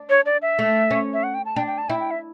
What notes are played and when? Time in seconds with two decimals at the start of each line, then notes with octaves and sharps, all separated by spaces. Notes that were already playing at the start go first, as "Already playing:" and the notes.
Already playing: D4
0.10 C#5
0.26 D5
0.42 E5
0.59 A3
0.91 C#4
1.13 E5
1.23 F#5
1.34 G5
1.45 A5
1.56 D4 G5
1.67 G5
1.78 A5
1.89 E4 G5
2.00 G5
2.11 E5